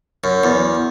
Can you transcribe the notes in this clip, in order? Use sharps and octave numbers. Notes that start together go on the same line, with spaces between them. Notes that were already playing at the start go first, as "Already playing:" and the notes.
F#2
E2